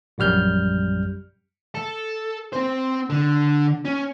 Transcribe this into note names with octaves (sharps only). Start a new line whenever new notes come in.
A#1 F#2 G3 F6 G6
A4
C4 C5
D3
C#4